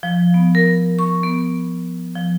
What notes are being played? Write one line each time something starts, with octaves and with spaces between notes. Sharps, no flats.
F3
B3
A#4
C#6
B3
F3